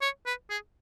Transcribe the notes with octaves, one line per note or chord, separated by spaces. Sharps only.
C#5
B4
G#4